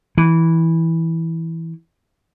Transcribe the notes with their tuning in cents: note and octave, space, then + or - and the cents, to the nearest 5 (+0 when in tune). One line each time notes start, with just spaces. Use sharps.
E3 -10